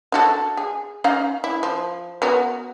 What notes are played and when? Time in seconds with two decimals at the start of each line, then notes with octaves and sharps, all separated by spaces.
0.12 D4 F#4 A4
0.57 G#4
1.04 C#4 D#4 F5
1.44 E4
1.63 F3
2.22 B3 F#4 A#4